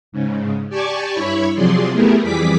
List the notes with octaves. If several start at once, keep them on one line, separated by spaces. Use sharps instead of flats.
G#2 C#3
G4 D5 G#5 A5 C#6
G2 E4 C#5 B5 C#6
C3 F3 F#3 G#4 D5 C6
A3 B3 E4 G4 G#4 A#4
F2 E3 G3 G#4 D6 B6